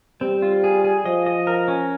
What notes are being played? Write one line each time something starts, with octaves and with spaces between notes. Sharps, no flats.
G3 C4
F4
G#4
G#4
F3 D#5
D#5
A#4
C#4